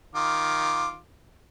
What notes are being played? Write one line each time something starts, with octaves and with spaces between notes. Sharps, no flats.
D#3 F4 D6